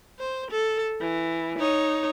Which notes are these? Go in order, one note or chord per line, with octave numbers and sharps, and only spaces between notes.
C5
A4
E3
D#4 C#5